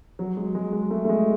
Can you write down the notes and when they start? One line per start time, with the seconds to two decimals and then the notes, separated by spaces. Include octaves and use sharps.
0.19 F#3
0.37 G#3
0.55 G#3
0.73 G#3
0.91 A3
1.05 A3
1.09 G#3